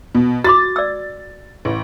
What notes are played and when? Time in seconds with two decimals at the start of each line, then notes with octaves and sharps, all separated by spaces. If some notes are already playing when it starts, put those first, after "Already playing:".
0.15 B2
0.44 F#4 C6 D6 A6
0.76 D5 E6
1.65 A1